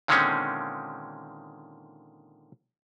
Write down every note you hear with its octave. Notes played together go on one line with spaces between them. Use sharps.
A#2 D3 D#3 G#3 C4 C#4